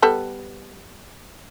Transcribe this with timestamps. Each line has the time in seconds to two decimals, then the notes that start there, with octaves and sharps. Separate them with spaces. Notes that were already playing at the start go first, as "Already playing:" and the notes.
0.02 G3 B3 A4